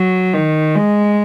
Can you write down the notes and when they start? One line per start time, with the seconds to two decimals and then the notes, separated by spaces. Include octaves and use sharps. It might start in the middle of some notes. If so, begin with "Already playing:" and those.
Already playing: F#3
0.34 D#3
0.75 G#3